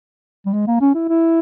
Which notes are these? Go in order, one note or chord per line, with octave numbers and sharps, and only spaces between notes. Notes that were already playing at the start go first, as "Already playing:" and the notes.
G3
G#3
A#3
C#4
E4
E4